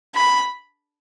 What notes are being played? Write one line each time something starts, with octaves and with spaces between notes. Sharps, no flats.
B5